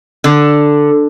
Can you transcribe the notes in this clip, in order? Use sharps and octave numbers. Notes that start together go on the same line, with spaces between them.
D3